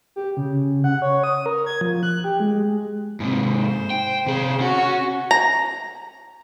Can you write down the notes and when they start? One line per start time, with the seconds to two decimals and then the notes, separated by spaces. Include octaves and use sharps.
0.16 G4
0.37 C#3
0.84 F#5
1.02 C#5
1.24 D#6
1.46 A#4
1.66 G#6
1.81 F3
2.03 F#6
2.24 G4
2.40 G#3
3.20 G#2 C3
3.56 C5
3.90 G5
4.26 C3 G#4
4.60 C#4 F#4
5.31 A#5